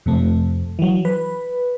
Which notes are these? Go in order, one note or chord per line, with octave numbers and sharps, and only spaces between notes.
F2 C3 A3
E3 F#3
B4